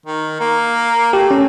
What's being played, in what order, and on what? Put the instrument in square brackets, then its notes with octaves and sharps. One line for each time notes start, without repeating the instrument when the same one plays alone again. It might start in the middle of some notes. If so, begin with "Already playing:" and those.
[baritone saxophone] D#3
A#3
[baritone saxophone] A3 [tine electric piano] G4
[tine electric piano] C#4